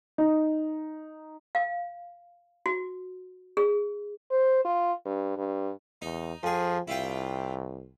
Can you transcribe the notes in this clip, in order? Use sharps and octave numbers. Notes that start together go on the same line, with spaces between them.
D#4
F5
F#4
G#4
C5
F4
G2
G2
E2 D#4
F2 F3 G#4
C2 E4 F4 G5